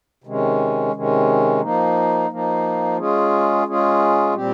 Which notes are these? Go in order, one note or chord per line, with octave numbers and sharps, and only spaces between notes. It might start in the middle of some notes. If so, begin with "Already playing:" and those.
C3 D#3 G#3 C#4
C3 D#3 G#3 C#4
F3 A#3 D#4
F3 A#3 D#4
G#3 C#4 F4 G#4
G#3 C#4 F4 G#4
A#2 G3 C4 G4